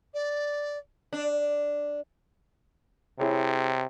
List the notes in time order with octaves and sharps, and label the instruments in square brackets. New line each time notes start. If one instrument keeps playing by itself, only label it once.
[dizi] D5
[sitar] D4
[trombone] C3 [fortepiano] E4 G#4 C#5